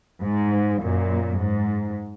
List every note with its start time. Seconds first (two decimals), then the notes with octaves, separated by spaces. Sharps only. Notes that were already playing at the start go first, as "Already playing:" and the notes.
0.22 G#2
0.80 F#2 A#2
1.39 G#2